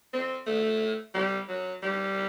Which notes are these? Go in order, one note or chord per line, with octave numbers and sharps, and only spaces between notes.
C4
A3
G3
F#3
G3